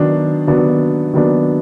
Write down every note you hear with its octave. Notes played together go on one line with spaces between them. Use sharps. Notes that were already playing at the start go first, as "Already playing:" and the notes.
Already playing: D#3 F#3 B3 D4
D#3 F#3 B3 D4
D#3 F#3 B3 D4